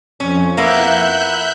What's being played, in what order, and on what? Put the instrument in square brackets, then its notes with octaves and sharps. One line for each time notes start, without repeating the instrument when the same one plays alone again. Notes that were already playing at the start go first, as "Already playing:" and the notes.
[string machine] F2 [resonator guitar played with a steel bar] C#4
[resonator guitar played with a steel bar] A#3 B3 E4 [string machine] E5 F#6 G6